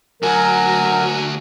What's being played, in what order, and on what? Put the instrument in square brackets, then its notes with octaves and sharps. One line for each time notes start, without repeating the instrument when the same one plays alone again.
[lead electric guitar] D2 F#4 [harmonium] F#3 A#4 [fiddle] G#5 A#5